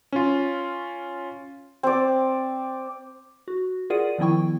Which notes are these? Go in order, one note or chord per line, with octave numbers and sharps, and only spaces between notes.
C#4 F4
C4 D5
F#4
F4 G#4 A#4 D5 F#5 D#7
D#3 F3 B3 E4 G5 C#6